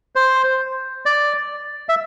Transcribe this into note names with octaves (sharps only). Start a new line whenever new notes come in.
C5
D5
E5